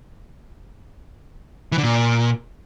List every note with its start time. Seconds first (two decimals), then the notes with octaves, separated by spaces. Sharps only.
1.72 E3
1.78 D3
1.84 A#2